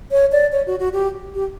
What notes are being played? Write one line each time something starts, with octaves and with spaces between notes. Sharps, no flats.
C#5
D5
C#5
F#4
F#4
G4
G4